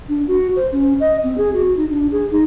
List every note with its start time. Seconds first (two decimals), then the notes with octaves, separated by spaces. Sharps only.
0.09 D4
0.28 F#4
0.56 C5
0.72 C#4
1.00 D#5
1.24 C4
1.38 G#4
1.54 F#4
1.77 D#4
1.91 D4
2.12 G#4
2.31 D#4